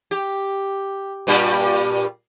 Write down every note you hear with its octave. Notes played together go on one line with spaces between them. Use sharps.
G4
G2 A#2 G3